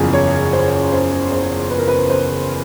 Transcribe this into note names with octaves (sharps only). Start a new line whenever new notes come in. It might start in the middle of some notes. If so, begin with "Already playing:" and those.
Already playing: F#1 E2 C#3 F3 G#4
C#5
C5
C5
C5
B4
A#4
B4
C5